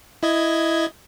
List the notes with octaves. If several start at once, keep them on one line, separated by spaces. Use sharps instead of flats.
E4 D#5 G#6